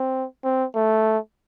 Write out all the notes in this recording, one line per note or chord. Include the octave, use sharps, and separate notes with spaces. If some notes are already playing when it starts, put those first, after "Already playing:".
Already playing: C4
C4
A3